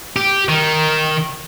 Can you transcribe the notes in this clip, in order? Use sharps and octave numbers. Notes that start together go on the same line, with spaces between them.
G4
D#3